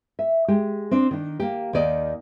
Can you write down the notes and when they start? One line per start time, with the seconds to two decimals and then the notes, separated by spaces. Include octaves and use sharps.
0.19 E5
0.48 G#3 G4
0.91 C4 D4 D5
1.11 D#3 D4
1.40 A#3 G4
1.73 D#2 D#3 D5 D#5